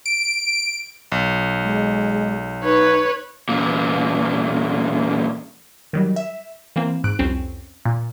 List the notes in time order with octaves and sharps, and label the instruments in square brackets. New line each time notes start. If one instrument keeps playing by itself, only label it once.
[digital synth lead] D7
[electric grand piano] B1
[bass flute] G#3
[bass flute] D#4 [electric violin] B4 C#5
[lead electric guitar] E2 A#2
[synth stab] D#3 F#3 G3
E5
E3 A#3 C4
G#2 F#6 D7
C2 F2 C4 C#4
A#2